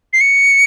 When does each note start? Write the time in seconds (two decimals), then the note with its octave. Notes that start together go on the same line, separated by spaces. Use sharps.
0.13 C7
0.21 C#7